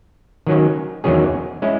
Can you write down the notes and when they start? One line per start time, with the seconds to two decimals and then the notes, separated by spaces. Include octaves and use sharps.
0.47 D#3 F#3 C#4
1.04 E2 D#3 F#3 C#4 G#4
1.62 G#3 C#4 E4